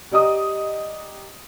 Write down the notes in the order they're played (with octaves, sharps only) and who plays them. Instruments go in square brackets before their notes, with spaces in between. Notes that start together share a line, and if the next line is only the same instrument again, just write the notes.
[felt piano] G4 D5 D#5 A#5 D#6